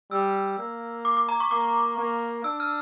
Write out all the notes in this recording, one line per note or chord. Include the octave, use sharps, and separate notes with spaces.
G3 E6
A#3
D6
D6
A#5
C#6
A#3 D6
A#3
D4 E6
F6